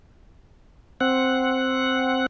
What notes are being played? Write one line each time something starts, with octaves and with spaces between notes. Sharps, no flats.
C4 F#5